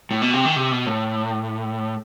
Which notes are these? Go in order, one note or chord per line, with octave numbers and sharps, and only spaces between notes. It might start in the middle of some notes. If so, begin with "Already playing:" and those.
A2
B2
C3
D#3
C3
B2
A2